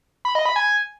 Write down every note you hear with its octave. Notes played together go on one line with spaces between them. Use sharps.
B5
D#5
B5
G#5